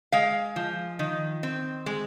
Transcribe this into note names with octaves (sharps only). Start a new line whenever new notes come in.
G#3 F5
F3
D#3
C4
G#3